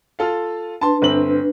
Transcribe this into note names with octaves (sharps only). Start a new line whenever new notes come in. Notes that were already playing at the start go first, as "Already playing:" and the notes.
F4 A4 F5
D4 B4 A5 C6
G1 C4 F#7